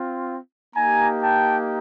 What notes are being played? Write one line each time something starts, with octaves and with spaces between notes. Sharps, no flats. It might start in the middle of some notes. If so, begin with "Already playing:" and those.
Already playing: C4 F4
A#3 D#4 G4 G#5 A#5
G5 A5